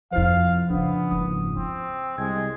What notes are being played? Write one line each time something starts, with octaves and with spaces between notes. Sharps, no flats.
F2 C3 F3 E4 C5 F5
A2 C#3 B3 D4
F#1 G#2 D#6
C4 E4
C2 G#3 G#6